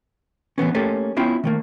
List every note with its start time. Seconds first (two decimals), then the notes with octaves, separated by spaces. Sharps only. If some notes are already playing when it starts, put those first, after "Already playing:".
0.58 A2 E3 B3 C#4
0.74 A3 A#3 C#4 G4 A4
1.17 B3 C#4 E4 F4 G5
1.44 D#3 A3 A#3